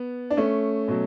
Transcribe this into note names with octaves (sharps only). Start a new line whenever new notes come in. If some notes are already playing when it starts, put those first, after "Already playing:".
Already playing: B3
D4
A3 C#4
B2 F#3